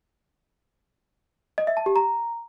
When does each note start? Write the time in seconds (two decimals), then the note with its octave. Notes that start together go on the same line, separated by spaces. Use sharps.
1.58 D#5
1.67 E5
1.77 A5
1.86 G4
1.96 A#5